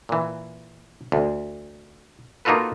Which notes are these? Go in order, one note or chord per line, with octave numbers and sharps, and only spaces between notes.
A#2 E3
D2
A#3 D#4 F4 F#4 A4 B4